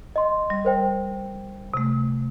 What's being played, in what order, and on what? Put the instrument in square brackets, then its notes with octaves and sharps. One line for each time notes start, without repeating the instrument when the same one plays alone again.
[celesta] D#5 C6
[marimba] G3
[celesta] A#4 C5 G5
[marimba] C3 A3